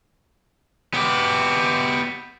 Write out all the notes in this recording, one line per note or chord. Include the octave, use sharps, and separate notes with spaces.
B3 G4